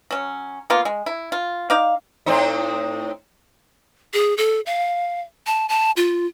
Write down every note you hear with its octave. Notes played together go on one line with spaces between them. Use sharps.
F#3 C#4
A#3 B3 F4
G#3
E4
F4
D#4 D5 F5
A2 C4 D#4
G#4
A4
F5
A5
A5
F4